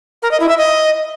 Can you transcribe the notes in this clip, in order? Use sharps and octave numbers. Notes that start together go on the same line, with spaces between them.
A#4
D#5
E4
E5
D#5